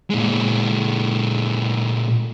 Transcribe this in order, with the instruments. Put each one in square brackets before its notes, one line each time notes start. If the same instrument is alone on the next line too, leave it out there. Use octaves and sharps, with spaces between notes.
[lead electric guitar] A#2 G#3